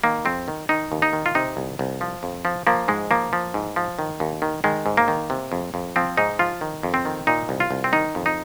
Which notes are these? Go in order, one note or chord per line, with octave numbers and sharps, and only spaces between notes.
D#3 A#3
F2 C4
D#3
D#3 D#4
D#2
D#4
D#3
F4
C3 D#4
C2
C2
F3
F2
F3
F3 A#3
G#2 G#3
F3 A#3
F3
G#2
F3
D#3
D#2
D#3
D#3 G#3
G#2
A#3
D#3
C3
F2
F2
F3 C4
G#2 D#4
F3 F4
D#3
F2
C4
D#3
A#2 D#4
C2
F4
C2
C4
D#3 D#4
F2
D#4